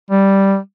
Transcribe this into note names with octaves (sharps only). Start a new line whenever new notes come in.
G3